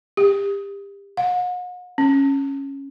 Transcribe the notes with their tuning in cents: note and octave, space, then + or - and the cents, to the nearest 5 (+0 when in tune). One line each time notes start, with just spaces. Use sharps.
G4 +30
F#5 -45
C#4 -10